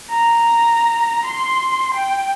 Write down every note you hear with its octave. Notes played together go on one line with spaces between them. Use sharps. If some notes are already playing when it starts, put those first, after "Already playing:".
A#5
C6
G5